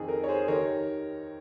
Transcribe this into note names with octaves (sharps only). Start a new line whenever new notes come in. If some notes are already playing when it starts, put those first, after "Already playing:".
Already playing: F2 D#3 G#4
A#4
C#5
G#4 C5
D#2 D#3 A#4 C#5